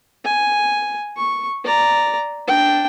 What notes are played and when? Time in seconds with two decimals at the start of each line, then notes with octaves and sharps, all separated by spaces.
0.25 G#5
1.17 C#6
1.64 D5 A#5
2.48 D4 G5